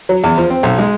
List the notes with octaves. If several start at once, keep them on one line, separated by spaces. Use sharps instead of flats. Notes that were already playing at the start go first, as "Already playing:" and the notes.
F#3
E2
F3
C4
B1
G#3